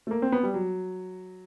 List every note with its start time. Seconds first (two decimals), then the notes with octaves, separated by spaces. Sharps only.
0.07 A3
0.11 A#3
0.22 C4
0.32 B3
0.43 G3
0.54 F#3